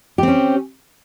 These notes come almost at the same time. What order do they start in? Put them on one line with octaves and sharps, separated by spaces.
G4 C4 C#4